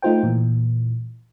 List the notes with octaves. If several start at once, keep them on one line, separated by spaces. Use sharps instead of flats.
A3 D#4 F4 C5 G5
A#2 E3